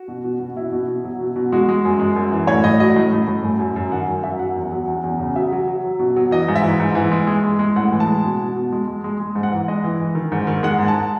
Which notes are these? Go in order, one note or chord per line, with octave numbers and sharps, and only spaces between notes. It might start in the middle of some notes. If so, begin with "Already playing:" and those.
Already playing: F#4
B2
B2
B2
B2 E4
B2
B2
F#3
B2
B2
G#3 F#4
G#3
F#2
G#3
F#2
E3
A2 C#5
A2 D#5
F#3 D#5
A2
A2
A2
F#2
F#2
F#2
D#3 F#5
F#2
F#2 E5
F#3 F#5
E2
F#3
E2
E2
C#3
F#3 E5
F#3
F#3
F#3
B2
F#3
E3 D#5
G#2
E5
E3
G#2
E3
G#3
G#3
G#3
G#3
A2 F#5
E3
A5
G#3
B2
B2
B2
G#3
G#3
G#3
G#3
G#2
F#5
E3
G#3 D#5
E3
E3
D#3
G#2
D#3
G#3 F#5
G#2
A5